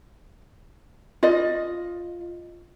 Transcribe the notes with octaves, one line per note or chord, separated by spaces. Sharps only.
F4 D#5